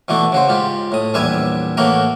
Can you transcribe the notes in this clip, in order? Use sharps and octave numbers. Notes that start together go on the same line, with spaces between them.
B2 E3 A3 D4
C#3 F#4 C5
G#2 F4 G4
A2 D#6
A#1 E2 G3 B4 E5 G#5
A2 E3 A#3 F#4 A#4